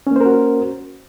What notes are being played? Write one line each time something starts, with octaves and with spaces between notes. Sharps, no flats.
A#3 C#4 F#4 A#4 C5